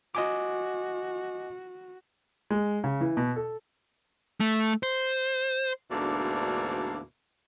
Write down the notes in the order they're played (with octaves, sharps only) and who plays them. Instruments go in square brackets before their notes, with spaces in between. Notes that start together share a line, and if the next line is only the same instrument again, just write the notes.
[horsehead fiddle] F#4 [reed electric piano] D#5 G#5 D6
[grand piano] G#3
C#3
E3
B2
A4
[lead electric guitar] A3
C5
[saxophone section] D2 G#2 B2 E3 A#3 D4